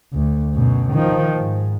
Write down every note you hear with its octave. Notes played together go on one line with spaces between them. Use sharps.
D2
F#2 B2
D#3 F3
G#2